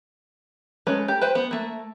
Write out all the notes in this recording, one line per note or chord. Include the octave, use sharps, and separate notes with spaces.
G#3 A3 C#4 B4
G4
B4 C5 G5
B3
A3 A#3